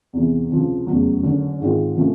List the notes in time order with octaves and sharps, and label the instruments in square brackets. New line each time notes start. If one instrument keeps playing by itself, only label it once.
[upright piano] E2 C3 E3
C#2 C3 F3
F1 E2 C#3 F#3
F#1 F#2 D3
G#2 D#3 G#3 C4 F4
C3 F3 A3 C#4